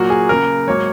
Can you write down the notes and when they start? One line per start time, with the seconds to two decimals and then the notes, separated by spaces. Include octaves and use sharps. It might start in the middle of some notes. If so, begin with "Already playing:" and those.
Already playing: A#2 F#3 A#3 F#4
0.10 G#4
0.29 C#3 A#3 A#4
0.67 G#2 F#3 A#3 C#5